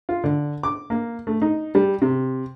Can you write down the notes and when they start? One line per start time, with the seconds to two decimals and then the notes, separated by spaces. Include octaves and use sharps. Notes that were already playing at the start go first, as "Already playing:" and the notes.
0.09 F4
0.24 D3
0.63 D6
0.90 A#3
1.27 A3
1.42 D#4
1.75 G3
2.02 C3